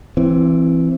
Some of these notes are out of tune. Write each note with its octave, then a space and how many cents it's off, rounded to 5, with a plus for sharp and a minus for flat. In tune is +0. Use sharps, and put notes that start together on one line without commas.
E3 +15 C4 +0